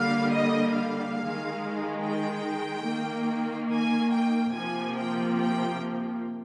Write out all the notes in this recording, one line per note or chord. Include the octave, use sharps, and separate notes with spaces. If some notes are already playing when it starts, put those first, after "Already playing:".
Already playing: D3 G3 A#3 F5
D#5
F5
D#3 G#3
G5
D#3 A#3
G#5
G5
C3 F3 A#3 G#5
G5
G5